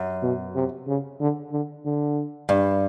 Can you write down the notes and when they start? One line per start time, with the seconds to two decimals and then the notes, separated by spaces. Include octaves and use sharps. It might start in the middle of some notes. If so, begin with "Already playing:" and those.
Already playing: F#2
0.23 B2
0.55 C3
0.87 C#3
1.20 D3
1.52 D3
1.85 D3
2.49 G2